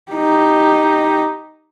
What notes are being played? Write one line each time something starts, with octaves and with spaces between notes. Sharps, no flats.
D#4 G4